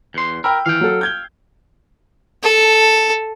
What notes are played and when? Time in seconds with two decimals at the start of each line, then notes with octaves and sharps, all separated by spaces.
0.14 E2 C6
0.44 A#4 G5 B5 E6
0.66 E3 F5 G5
0.81 F#3 A4
1.01 G6 G#6 G7
2.43 A4